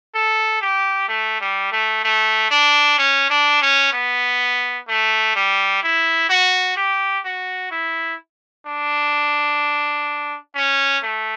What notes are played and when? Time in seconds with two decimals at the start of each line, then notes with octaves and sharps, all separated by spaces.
0.14 A4
0.61 G4
1.08 A3
1.40 G3
1.72 A3
2.04 A3
2.51 D4
2.98 C#4
3.30 D4
3.62 C#4
3.93 B3
4.88 A3
5.35 G3
5.83 E4
6.29 F#4
6.76 G4
7.25 F#4
7.71 E4
8.67 D4
10.55 C#4
11.03 A3